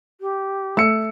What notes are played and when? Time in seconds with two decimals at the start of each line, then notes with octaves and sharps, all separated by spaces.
0.21 G4
0.77 A3 E6 C#7